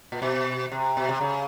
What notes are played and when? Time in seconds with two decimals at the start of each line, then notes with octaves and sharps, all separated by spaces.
0.12 A#2
0.22 B2
0.72 C3
0.97 B2
1.09 C3
1.21 C#3